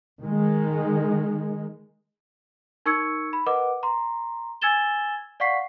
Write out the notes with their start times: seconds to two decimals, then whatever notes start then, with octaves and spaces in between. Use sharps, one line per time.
0.20 D#3 G#3
2.86 D#4 A#4 C#6 E6 G#6 C#7
3.33 B5
3.46 A#4 B4 D#5 F#5 D6
3.83 A#5 C6
4.61 G#5 E6 G#6 A6 E7 G7
5.40 D5 F5 F#5 C#6 B6 C7